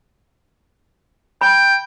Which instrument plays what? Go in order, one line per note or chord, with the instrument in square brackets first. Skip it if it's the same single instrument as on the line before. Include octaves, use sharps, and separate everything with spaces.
[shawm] G5 [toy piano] B5